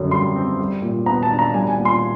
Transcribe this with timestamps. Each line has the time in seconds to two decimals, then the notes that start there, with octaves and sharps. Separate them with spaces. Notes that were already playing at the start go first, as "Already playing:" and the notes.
Already playing: F#2 D3 G3 C4
0.11 G3 C6
0.36 C4
0.59 G3
0.82 A#2
1.06 B3 A#5
1.23 A5
1.30 D4
1.39 A#5
1.54 G3 G#5
1.70 G#5
1.78 A#2
1.85 C6